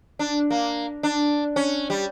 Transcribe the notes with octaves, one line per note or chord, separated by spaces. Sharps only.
D4
A#3
D4
C#4
G3